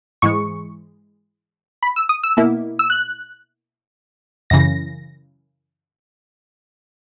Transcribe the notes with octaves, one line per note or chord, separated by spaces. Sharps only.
G#2 E3 G#3 C#6
B5
E6
D#6
E6
B2 A#3 E4
E6
F#6
F#2 C#3 E3 A#6